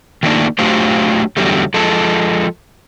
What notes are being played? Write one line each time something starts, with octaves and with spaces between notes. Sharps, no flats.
D#3 F3 A3 A#3 D4 D#4
F#3 A3 D4 F4 G4 C5
E2 G#2 D3 F#3 G3 A3
F3 G#3 A4